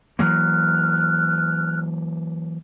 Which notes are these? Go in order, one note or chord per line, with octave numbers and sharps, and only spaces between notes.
E3 F#3 A#3 F6 F#6